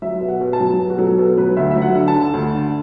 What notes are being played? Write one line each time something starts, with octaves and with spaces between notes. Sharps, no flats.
F#3 E5
B2
F#5
B2
A5
F#3
B2
F#4
F#3 A4
B2 A4
F#3 B4
D2 E5
F#3 E5
F#5
D3
A5
D3
D2
D3